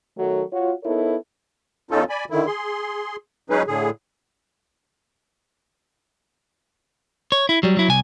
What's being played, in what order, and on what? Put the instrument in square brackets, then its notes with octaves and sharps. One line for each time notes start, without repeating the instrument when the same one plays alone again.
[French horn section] D#3 F#3 A3
F4 F#4 C#5
B3 D#4 E4 A4 A#4 C#5
[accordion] E2 C#4 D#4 F4 A4
D5 G#5 B5
D3 D#3 E4
G#4 C6
F#3 G#3 C#4 D#4 G#4 B4
A2 D3 G#4
[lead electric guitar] C#5
E4
F#3 G3
F#3 E4
C2 G#5